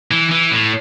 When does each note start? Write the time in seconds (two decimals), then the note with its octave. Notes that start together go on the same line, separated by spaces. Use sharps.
0.11 E3
0.31 E3
0.51 A2